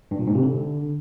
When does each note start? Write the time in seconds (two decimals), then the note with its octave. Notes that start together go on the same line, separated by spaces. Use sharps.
0.11 G2
0.19 A#2
0.27 G#2
0.35 C3
0.43 D3